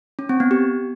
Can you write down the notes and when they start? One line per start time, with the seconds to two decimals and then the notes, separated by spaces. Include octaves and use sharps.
0.19 C#4
0.29 C4
0.40 B3
0.51 G4